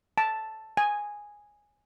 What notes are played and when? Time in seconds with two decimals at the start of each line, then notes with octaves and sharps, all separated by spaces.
0.18 A5
0.77 G#5